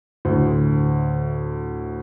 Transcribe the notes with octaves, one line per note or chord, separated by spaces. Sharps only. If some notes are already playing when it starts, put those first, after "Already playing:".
D2 A2